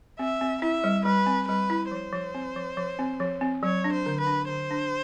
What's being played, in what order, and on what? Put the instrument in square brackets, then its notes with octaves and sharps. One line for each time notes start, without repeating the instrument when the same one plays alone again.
[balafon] C4 [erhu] E5
[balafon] C4
[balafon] E4 [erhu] E5
[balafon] G3
[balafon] G3 [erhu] B4
[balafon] C4
[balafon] G3 [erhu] B4
[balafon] E4
[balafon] F3 [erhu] C5
[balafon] F3
C4
F3
F3
C4
F3
C4
[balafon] F#3 [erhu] C#5
[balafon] D4
[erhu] C5
[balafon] D3
[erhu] B4
[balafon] D4
[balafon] D3 [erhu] C5
[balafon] D4